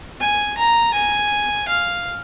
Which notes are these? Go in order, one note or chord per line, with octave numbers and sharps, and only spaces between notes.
G#5
A#5
G#5
F5